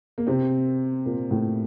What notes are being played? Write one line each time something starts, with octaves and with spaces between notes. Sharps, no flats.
A#3
C3 C4
A#2 A#3
A2 A3